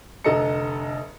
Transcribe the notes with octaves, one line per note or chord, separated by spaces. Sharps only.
F1 D3 A4 D#5 A#5 C#7